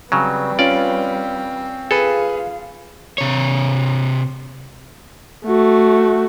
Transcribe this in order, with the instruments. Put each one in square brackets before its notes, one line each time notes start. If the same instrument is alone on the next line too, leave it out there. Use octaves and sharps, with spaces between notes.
[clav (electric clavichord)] C#3 F#3 [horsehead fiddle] G3 B4 [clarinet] C4
[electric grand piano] C#4 F4 [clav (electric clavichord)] D5
[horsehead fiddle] F4 F5 [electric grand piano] G#4 B4 [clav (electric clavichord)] A4
[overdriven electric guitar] C3 C#5
[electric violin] A3 F#4